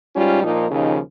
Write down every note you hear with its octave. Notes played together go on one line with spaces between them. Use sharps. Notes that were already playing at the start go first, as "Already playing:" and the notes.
G#2 G3 C#4 F4
A#2 F3 A#3 D#4
D#2 C#3 F3 D#4